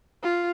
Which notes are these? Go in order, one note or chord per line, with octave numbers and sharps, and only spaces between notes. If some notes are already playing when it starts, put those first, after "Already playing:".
F4